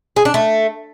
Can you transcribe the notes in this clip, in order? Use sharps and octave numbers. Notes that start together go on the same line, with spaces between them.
G#4
D4
A3